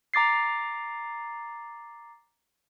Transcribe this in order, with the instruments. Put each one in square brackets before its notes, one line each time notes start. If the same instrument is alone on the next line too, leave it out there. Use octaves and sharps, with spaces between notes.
[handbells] A#5 D6 A6 C7